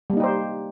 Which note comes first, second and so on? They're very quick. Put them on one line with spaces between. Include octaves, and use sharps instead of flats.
G3 A#3 D#4 G4 C5